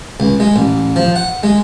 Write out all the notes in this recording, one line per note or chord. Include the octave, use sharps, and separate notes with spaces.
C#2
G#3
A1
F3
F#5
G#3